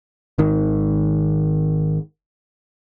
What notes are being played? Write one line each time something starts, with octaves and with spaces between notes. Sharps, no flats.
G#1 D#3